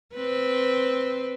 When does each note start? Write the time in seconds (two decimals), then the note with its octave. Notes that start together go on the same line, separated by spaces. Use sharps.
0.14 C4 B4